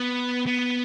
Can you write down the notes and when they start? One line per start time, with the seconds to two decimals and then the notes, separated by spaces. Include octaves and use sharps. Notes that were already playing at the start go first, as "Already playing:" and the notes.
Already playing: B3
0.47 B3